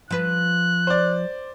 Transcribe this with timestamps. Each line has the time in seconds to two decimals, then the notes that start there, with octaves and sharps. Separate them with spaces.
0.11 F3 B4 F#6
0.87 C5 D5